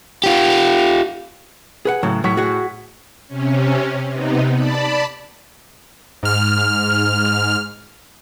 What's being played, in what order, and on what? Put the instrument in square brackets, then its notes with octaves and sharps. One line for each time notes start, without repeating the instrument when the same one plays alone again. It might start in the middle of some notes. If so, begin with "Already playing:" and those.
[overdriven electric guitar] F4 G4
[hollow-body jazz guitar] G#4 B4 F#5
[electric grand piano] A2 [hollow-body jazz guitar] C#3 F#3
[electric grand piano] A2 C#6 B6 [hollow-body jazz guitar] F#3
[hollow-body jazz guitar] F#4 G#4 F#5
[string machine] C3 C#4
C3 B3 D#4
D5 A5 B5
[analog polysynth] G#2 F6